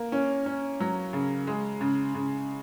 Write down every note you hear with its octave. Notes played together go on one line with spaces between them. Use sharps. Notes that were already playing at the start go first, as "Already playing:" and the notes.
Already playing: A#3
C#4
C#4
F#3
C#3
G#3
C#3
C#3